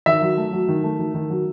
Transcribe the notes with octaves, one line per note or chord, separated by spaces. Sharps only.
D#3 E5
F#3
A3
F#3
D#3
A3
D#3
D#3
F#3